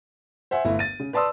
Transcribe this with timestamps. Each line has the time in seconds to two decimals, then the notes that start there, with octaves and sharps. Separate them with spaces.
0.51 C5 E5 F#5 G#5 C6
0.65 G1 A3 E4
0.79 A6 D#7
1.00 C#3
1.13 B4 D5 A5 C6 D#6 E6